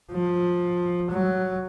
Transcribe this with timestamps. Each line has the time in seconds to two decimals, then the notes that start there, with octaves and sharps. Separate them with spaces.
0.12 F3
1.10 F#3